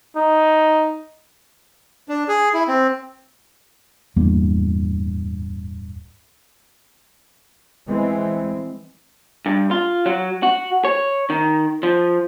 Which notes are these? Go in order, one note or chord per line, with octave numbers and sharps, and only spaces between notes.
D#4
D4
G#4
E4
C4
D1 E2 G2 A#3
E3 G#3 C4
G2
F4
F#3
F#4
C#5
D#3
F3